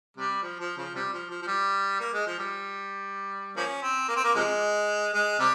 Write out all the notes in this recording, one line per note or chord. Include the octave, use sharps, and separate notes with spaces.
C3 G3
F3
F3
C#3 F3
C3 G3
F3
F3
F3
G3
A#3
G#3
F3
G3
F3 A#3 C#4
C4
A#3
C4
A#3
C3 F3 G#3
G#3
C3 G3